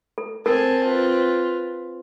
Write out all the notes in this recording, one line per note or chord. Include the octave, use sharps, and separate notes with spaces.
A4
C4 A4 A#4 G#5 A5
F4 B4